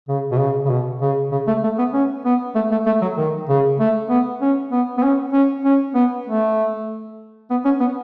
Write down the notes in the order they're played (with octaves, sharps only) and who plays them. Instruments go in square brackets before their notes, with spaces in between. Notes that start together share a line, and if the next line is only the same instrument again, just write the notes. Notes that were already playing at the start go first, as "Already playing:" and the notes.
[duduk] C#3
B2
C#3
C#3
B2
C#3
C#3
A3
A3
B3
C#4
B3
A3
A3
A3
F#3
D#3
C#3
A3
B3
C#4
B3
B3
C#4
C#4
C#4
B3
A3
B3
C#4
B3